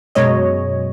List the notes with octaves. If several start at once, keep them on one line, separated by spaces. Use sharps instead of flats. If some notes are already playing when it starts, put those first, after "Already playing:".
F#2 B2 F#3 G#3 C#5 D#5